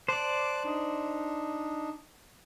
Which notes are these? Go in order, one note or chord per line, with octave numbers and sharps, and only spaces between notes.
C5 D5 A5 D6 F#6
D4 D#4